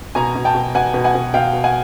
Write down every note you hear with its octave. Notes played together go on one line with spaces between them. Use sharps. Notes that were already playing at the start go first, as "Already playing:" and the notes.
B2 G#5 A#5
B2
G5 A5
B2
B2 F#5 G#5
B2
F#5 G#5
B2
B2 F5 G5
B2
F#5 G#5